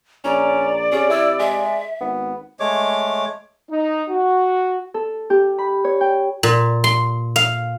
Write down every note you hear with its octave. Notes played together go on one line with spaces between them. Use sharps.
A#1 C#4 D5 A#5
C3 C#4 G#4
E4 E6
G#3 E5
G#1 B3
G#3 A3 C#5 D6
D#4
F#4
A4
G4
B5
C#5
G5
A#2
C6
F5